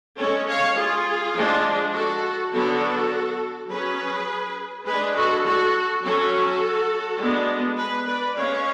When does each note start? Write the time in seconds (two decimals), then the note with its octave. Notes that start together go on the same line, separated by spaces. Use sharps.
0.17 G#3 C#4 A4 C#5
0.47 C#5 F5
0.76 F4 G#4
1.34 F3 G#3 D4
1.93 F#4 A4
2.51 D3 F#3 B3 D4 F#4 A4
3.69 F#3 C#4 G#4 B4
4.85 G#3 D4 G#4 B4
5.16 F#4 A4
5.44 F#4 A4
6.02 F#3 C#4 F#4 A4
7.20 G#3 B3 D4
7.78 G#4 B4
8.07 B4 D5
8.36 G#3 C#4 C#5 F5